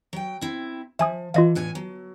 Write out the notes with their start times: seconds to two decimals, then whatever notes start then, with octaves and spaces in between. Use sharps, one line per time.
0.13 F#3 G5
0.41 C4 E4
0.99 F3 E5 G#5 D#6
1.34 E3 F4 D#5 F5
1.55 E2 A2 G#5
1.75 F#3